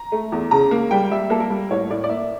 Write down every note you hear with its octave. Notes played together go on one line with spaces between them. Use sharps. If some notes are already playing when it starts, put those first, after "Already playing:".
Already playing: A#5
A3
E2
C#3 A#5
A#3
G3 G5
G3 E5
A#3 A4
A#4
G3
A2 C#5
A2 D5
D5
A#3 E5